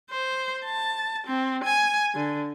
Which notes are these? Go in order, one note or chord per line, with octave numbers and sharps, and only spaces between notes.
C5
A5
C4
G#5
D3